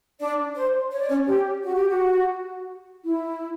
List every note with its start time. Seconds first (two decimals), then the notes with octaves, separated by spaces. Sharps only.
0.20 D4 D5
0.55 C5
0.91 C#5
1.00 D5
1.09 C#4 C#5
1.27 G4
1.62 F#4
1.75 G4
1.89 F#4
3.04 E4